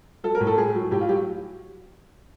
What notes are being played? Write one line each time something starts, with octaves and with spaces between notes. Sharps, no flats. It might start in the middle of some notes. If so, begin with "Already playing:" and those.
F#3 A4
A#4
A2
A4
A2 G#4
F#3
A2 G4
F4
F#3 G4